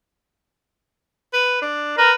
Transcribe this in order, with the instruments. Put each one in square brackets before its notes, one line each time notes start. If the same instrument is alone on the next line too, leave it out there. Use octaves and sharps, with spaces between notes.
[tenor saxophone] B4
D4
[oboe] A#4 [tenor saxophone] B4